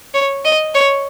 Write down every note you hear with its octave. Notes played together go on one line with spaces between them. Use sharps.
C#5
D#5
C#5